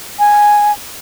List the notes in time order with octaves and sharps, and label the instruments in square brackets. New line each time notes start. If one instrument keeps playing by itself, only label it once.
[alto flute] G#5